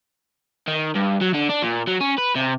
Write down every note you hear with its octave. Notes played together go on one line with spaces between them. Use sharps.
D#3
G2
F#3
D3
D4
A#2
F#3
C#4
B4
C3